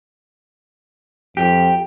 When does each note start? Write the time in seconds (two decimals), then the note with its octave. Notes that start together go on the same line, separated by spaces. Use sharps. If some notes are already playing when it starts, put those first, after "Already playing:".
1.37 F2 G4